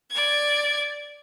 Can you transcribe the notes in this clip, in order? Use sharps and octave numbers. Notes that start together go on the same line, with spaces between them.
D5 G#6